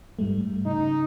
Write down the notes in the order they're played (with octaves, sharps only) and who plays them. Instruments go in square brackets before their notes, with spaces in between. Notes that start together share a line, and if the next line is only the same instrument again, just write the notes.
[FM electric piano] G#2 G3 A3
[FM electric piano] C#3 [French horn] D#4